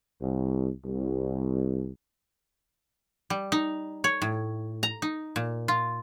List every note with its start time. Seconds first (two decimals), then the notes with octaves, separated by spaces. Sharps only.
0.20 C2
0.85 C2
3.30 G3
3.52 D#4
4.04 C#5
4.22 A2
4.83 A#5
5.02 D#4
5.36 A#2
5.68 F4